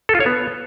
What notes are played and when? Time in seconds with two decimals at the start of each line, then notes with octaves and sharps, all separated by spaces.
0.09 A4
0.15 F4
0.20 C#5
0.26 B3